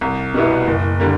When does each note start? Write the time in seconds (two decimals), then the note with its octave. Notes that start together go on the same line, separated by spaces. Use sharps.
0.01 C2
0.34 B2 G3 B3 E4
0.67 F#1
1.00 D3 G3 A#3